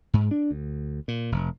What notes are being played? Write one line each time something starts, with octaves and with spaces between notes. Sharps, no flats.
G#2
D4
D2
A#2
F1